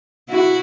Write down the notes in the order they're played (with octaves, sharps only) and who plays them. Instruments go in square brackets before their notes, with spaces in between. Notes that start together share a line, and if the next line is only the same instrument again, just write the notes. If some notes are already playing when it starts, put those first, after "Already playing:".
[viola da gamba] E4 F#4